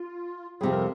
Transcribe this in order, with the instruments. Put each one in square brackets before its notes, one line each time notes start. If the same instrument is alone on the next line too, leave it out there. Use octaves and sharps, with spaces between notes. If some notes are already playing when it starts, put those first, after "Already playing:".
Already playing: [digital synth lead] F4
[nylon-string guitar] F2 C3 G3 [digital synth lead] G#4
[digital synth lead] A#4